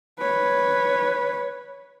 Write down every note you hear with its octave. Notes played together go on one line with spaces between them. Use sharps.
B4 C#5